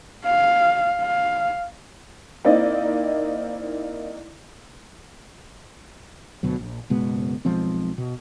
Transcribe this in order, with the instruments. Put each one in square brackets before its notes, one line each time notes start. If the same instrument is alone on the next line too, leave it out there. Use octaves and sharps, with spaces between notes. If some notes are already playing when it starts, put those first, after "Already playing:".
[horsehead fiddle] F5
F5
[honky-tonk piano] A#3 C4 D#4 E4 D5 D#5
[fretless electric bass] D2 B2 F#3
A#1
F#1 B2 G#3 B3
B1 F3 G#3 C4
B2